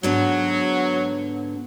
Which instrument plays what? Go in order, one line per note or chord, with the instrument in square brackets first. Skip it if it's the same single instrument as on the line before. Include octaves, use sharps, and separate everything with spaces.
[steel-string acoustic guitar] G#2 D3 B3 [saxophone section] F#3